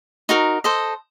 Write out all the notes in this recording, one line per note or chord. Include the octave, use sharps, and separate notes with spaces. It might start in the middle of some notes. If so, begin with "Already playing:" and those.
D#4 F#4 A#4
A4 C5 D#5